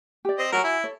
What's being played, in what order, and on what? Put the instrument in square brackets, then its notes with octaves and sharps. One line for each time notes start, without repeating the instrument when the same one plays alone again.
[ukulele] G4 D5
[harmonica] C4 D#5
[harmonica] F#3 A#4 [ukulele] F#4 G#5
[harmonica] E4
[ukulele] A4 C#5